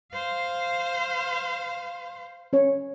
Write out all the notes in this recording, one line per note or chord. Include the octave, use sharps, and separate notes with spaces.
C5 F5
C#4 C#5